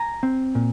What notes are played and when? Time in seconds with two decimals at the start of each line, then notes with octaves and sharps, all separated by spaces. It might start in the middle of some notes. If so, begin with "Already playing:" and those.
Already playing: G#5 A#5
0.23 C4
0.55 A#2